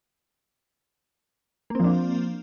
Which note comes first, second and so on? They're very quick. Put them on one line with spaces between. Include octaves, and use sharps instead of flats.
A#3 C4 F3 D4